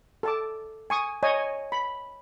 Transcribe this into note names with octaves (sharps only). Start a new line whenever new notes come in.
A4 A5 D6
G#5 C#6 D#6
C#5 D#5 G#5
B5